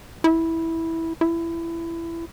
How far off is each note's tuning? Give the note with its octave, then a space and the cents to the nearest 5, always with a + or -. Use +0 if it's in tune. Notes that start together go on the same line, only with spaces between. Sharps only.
E4 -10
E4 +20